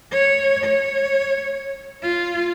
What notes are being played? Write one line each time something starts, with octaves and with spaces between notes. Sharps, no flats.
C#5
C#5
F4